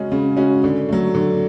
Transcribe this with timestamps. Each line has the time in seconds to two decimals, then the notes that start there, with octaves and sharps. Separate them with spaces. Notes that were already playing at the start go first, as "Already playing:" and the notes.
Already playing: C#3 G#3 C#4 F#4
0.12 C#3
0.37 G#3 C#4 F#4
0.64 D3
0.89 F#3 A3
1.15 D3